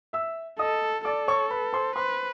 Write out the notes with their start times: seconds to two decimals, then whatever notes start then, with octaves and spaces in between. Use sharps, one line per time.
0.13 E5 E6
0.59 A4 D#5 D#6
1.04 A4 D5 D6
1.28 C#5 C#6
1.50 B4 B5
1.73 C5 C6
1.96 B4 C5 C6